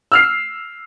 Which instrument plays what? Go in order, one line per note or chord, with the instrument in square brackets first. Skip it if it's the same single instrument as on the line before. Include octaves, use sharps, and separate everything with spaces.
[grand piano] E6 F6 C7